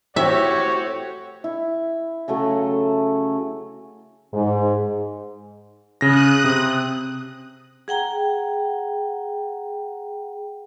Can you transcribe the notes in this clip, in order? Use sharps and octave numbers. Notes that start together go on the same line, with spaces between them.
A2 C4 F#4 G4 C#5 E5
E4
C#3 F#3 A3 A4
G#2
C#3 D#6 F#6 A#6
C3 C4
G#4 F#5 G5 A#5